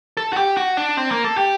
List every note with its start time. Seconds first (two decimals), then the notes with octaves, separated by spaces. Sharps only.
0.17 A4
0.33 F#4
0.37 G4
0.57 F#4
0.77 D4
0.97 C4
1.11 A#3
1.24 A4
1.37 G4